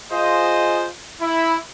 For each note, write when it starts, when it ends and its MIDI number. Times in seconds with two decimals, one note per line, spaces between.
0.11 0.87 65
0.11 0.87 68
0.11 0.87 72
0.11 0.87 75
1.21 1.55 64